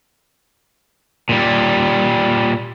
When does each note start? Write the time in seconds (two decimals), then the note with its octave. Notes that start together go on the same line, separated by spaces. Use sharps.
1.29 A#2 G3